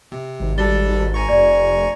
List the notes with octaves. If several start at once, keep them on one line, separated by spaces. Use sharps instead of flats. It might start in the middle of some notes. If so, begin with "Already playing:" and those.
C3
G#1
G3 D4 A4 A6 G7
G#5 A#5 C#6
F1 D5